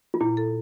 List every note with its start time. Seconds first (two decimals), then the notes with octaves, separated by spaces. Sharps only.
0.14 F4
0.21 A#2 E4
0.37 A4